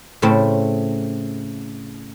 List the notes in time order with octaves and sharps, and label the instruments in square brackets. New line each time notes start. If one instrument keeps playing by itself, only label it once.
[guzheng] A2 C#3 A3 C4